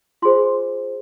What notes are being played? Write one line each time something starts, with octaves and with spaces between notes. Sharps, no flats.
F4 G#4 C5 C6